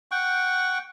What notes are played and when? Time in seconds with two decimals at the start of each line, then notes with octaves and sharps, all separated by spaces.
0.11 F#5 G5 C#6